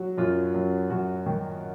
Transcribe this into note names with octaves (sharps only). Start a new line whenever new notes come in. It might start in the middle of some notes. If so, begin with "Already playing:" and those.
Already playing: F#3 F#4
F#2 F4
F#2
F#2 F#4
D#3